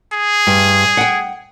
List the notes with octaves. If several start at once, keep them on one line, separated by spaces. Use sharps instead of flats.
G#4
G2
F#5 G5